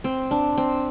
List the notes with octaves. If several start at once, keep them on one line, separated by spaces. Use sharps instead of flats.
C4
D4
C4